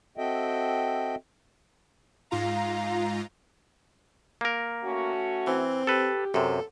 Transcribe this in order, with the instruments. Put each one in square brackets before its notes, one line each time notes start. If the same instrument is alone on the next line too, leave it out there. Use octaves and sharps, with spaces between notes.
[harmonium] C4 F#4 A4 D#5 E5 G5
[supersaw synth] G#2 F4 A#5 [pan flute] F5
[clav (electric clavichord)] A#3 A#4
[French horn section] A3 C#4 F#4
[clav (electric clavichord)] E3 [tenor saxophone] C4
[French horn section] G4 [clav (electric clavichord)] A4 B4
[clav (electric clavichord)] F#2 C3 [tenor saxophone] A4